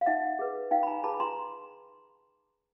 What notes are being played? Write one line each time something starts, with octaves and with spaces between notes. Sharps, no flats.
F5
D#4 E5 F#5
G#4 B4
D#4 F5 G5
B5
G#5 A#5
G#4 B4 A5 B5
B5
A#5 C6